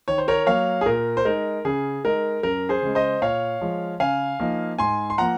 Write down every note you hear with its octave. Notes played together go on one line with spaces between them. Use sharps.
D#3 C#5
C5
A#4 C#5
F#3 A#3 C#5 F5
G#4
A#2 A#4
C5
G#3 D#4 A#4
C#3 G#4
G#3 D#4 A#4
F#2 A#4
G#4 C5
C#3 G#3
C5 D#5
A#2 C#5 F5
F3 G#3
C#3 F5 G#5
F3 A#3 D#4
G#2 G#5 C6
C6
F3 A#3 F#5 A#5